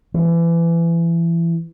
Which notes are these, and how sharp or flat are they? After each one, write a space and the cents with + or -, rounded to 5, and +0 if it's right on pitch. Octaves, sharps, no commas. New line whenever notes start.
E3 +30